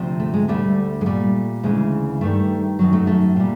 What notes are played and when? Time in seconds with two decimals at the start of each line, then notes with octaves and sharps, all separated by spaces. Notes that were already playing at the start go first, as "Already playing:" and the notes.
Already playing: D2 C3 F3
0.20 A3
0.34 G#3
0.48 D2 D3 G3 A3
1.01 G#3
1.06 A#2 G3 A3
1.63 D2 C#3 E3 G#3
2.21 G2 D#3 G3 A3
2.79 F#2 D#3 F#3
2.93 A3
3.07 A3
3.36 A#2 G3